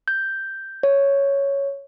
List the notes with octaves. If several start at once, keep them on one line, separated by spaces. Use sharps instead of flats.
G6
C#5